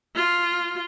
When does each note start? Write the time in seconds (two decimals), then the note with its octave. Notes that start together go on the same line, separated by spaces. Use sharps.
0.15 F4